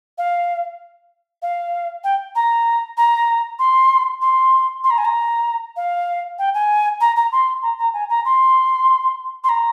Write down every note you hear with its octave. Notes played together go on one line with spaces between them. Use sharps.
F5
F5
G5
A#5
A#5
C6
C6
C6
A#5
G#5
A#5
F5
G5
G#5
A#5
A#5
C6
A#5
A#5
G#5
A#5
C6
C6
A#5